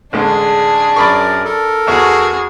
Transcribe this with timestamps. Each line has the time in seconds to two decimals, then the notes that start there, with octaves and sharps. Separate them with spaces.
0.13 A1 D3 G#3 D4 G#4
0.96 F#2 A#4 D5 B5 C#6
1.45 A4 A#4
1.87 E2 F#4 G#4 E5 C#6